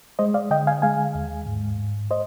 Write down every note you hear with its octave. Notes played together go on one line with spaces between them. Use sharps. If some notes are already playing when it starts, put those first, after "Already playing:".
G#3 C5 D#5
D5 F5
D3 D#5 G5
F5 G#5
G#3 F5 G#5
D#2
G#2
G#2
C5 D#5